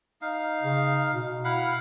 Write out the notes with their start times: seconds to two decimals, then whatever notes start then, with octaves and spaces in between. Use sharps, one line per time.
0.22 D#4 F5
0.63 C#3
1.12 B2
1.44 E4 F5 F#5